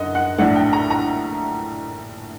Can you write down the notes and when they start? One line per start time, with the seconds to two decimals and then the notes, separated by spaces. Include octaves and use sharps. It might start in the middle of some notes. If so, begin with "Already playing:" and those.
Already playing: F#1 F#2 D3 D#5 F#5
0.15 F#5
0.38 A#1 A2 A3 D4 F#5
0.56 G5
0.73 A#5
0.90 A#5